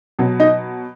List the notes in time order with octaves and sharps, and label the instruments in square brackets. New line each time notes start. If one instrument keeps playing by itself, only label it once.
[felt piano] B2 F#3
D#4 D#5